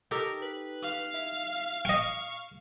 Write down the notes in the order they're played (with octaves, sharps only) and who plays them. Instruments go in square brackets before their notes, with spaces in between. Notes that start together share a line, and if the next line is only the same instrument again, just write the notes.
[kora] D#4 G4 A4 [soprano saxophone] A#4
[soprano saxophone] B4
[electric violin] F5
[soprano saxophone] E5
[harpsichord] D#5 G5 [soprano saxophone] C#6